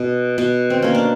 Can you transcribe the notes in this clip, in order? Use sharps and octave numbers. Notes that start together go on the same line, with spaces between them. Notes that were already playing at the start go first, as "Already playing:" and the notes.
Already playing: B2
B2
C4
A#3 C#4
D4